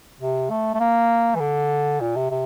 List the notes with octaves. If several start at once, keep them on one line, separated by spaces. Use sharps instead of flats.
C3
A3
A3
A#3
E3
D3
A#2
C3
C3